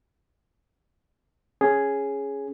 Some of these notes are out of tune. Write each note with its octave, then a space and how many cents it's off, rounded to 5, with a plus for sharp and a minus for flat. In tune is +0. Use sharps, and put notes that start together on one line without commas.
C#4 +0 G#4 +0